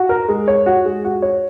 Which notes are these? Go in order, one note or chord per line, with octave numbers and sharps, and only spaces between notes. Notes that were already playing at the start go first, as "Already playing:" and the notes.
Already playing: F#4
A#4
G#3
C#5
F#4
G#3
F#4
C#5